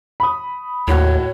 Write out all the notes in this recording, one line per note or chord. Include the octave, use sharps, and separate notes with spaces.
B5 D#6
D#2 A2 F#4 C#5